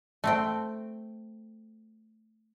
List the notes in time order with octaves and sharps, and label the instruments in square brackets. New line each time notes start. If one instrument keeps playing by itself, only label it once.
[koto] A3 C4 G5